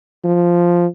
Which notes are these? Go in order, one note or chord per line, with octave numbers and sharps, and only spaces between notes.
F3